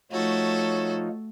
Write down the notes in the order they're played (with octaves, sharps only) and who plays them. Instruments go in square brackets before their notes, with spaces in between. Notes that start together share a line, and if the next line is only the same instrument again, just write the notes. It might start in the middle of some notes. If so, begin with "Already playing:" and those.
[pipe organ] F3 D#4 F4 [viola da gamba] A3 [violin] F#4 A4 [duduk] C#5